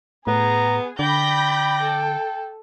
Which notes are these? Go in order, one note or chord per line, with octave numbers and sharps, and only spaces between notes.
A2 B3 G#4 A#5
D3 D5 G5 B5 G6 A#6
A4